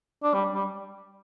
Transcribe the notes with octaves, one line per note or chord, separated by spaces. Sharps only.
D4
G3
G3